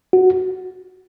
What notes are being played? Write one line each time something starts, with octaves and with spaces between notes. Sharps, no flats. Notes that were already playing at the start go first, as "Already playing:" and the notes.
F#4